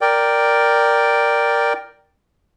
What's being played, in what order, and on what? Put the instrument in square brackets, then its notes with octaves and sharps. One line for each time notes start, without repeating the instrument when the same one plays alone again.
[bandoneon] A#4 D5 G5